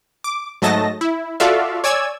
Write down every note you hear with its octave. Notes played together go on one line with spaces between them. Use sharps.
D6
G#2 F#3 A3 D#5 A5 A#6
E4
F4 F#4 A4 D5 E5 F5
C#5 D5 G#5 E6 G#6